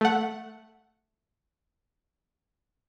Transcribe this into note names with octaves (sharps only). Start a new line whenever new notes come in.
A3 F#5